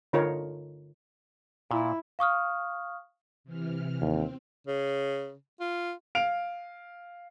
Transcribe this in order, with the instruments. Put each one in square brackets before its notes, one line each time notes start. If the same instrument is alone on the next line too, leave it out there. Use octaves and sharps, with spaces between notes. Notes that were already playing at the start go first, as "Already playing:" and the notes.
[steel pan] D3 D#4 F4 A#4 C#5
[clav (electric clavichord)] A#2 [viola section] E4
[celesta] F5 C#6 D#6 F6
[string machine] C3 E3 F6
[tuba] D#2 [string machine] C4
[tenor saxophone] C#3
F4
[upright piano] F5 D7 F7